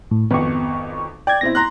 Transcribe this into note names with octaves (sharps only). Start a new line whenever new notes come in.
A2
G#1 F2 B3 C#6
D5 G5 G#6
B2 C4 E4 A#6
A#5 C6 F#6